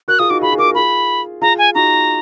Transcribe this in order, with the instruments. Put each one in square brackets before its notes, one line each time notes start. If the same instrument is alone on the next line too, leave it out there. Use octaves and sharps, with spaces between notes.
[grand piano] F#4 A#4 [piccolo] F#6
[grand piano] F4 G#4 [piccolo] D#6
[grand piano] D#4 F#4 [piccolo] D6
[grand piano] F4 G#4 [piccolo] B5
[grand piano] G#4
[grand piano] F#4 A#4 [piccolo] D6
[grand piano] A#4
[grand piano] F4 G#4 [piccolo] B5
[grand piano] F4 G#4 [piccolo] A#5
[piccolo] G#5
[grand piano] D#4 F#4 [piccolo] A#5